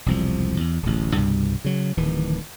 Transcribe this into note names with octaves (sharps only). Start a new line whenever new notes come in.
E1 C2 F3
E2
D1 A1
C2 G2 B2
C#3 F#3
D1 D#3 E3